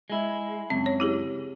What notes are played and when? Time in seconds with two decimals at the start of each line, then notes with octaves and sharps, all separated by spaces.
0.10 G#3 E4
0.70 C#2 F#2 C4
0.86 C#5
1.00 E4 G4 G#4